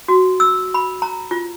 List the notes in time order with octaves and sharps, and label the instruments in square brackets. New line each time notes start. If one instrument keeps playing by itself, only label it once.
[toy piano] F#4
E6
B5
A#5
F4